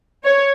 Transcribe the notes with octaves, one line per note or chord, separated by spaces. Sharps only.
C#5